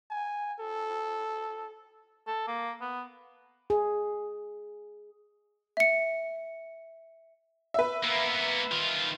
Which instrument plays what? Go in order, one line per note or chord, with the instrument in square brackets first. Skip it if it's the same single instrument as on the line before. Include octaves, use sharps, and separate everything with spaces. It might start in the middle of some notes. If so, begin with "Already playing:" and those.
[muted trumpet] G#5
A4
[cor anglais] A4
A#3
B3
[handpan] G#4
[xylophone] E5 C#7
[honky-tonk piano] B4 E5
[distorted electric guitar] A#3 B3
D#3 F4